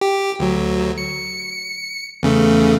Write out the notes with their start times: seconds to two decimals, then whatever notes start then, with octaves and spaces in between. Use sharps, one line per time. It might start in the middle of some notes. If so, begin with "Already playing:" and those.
0.01 G4
0.39 D2 F#3
0.98 C#7
2.23 E2 C#3 A3